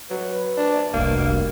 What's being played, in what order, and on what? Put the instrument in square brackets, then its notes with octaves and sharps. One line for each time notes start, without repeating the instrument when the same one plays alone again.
[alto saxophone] F#3 [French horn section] B4
[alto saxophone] D4
[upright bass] F1 C2 [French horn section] G2 F#4 [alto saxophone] A#3